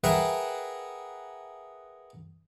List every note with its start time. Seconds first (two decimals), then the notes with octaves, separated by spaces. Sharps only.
0.04 G#4 A#4 B4 E5 F#5 G5